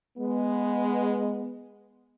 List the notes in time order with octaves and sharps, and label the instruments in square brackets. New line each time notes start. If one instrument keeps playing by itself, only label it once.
[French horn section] G#3 B3